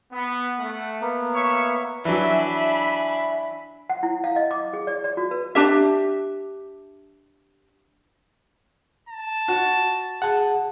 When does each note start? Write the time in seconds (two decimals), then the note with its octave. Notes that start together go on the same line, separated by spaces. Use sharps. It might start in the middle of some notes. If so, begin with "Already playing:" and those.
0.12 B3
0.60 A3 F#5
1.01 A#3 B3
1.34 C#5 E5 C#6
2.05 E3 F#3 D4 E5 G#5 B5
3.90 F#5
4.03 E4
4.24 F5
4.36 D#5
4.51 D6
4.73 G#4
4.87 D5
5.04 D5
5.17 F#4
5.31 B4
5.55 D4 G4 E5
9.09 A5
9.48 F#4
10.22 G#4 F#5 A5